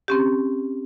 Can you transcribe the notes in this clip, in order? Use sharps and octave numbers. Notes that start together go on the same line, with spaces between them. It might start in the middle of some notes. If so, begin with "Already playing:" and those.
C4 C#4 G4